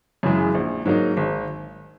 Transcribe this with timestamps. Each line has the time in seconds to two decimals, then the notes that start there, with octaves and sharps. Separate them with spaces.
0.23 F#2 C#3 E3 G#3
0.55 A#1
0.86 G#2 F#3 A#3 D#4
1.17 G#1